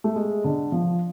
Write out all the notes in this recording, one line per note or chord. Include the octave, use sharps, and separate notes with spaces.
A3
G#3
D3
F3